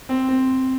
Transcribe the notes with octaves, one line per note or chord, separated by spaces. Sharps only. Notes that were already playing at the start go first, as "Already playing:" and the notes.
C4
C4